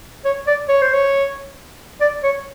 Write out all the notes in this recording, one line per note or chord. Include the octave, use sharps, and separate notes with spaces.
C#5
D5
C#5
C5
C#5
D5
C#5